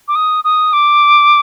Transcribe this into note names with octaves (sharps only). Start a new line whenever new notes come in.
D6
D#6
D#6
D6